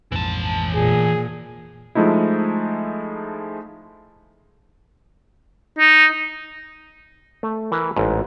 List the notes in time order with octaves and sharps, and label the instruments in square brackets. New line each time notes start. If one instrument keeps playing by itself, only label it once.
[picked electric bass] A#1 F2 G#2 [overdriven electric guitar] E3 A5
[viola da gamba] A#2 [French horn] G#4
[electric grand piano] F3 G#3 A3 D#4 E4
[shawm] D#4
[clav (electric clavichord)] A3
E3 A#4 B4
A1 G#2